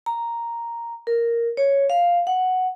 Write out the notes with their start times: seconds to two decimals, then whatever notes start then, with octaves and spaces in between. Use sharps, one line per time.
0.06 A#5
1.07 A#4
1.57 C#5
1.90 F5
2.27 F#5